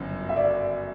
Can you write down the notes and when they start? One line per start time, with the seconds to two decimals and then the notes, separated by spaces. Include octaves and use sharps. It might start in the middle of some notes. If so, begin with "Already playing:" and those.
Already playing: G1 F#2 C#3
0.29 E5
0.36 D5